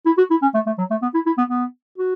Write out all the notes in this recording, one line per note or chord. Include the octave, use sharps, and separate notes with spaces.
E4
F#4
E4
C#4
A3
A3
F#3
A3
B3
E4
E4
B3
B3
F#4